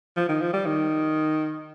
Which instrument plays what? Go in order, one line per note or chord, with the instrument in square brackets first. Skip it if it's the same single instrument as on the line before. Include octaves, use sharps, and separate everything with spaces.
[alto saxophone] F3
D#3
F3
G3
D#3